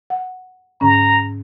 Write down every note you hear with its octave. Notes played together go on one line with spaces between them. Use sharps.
F#5
G#2 D3 C#4 A#5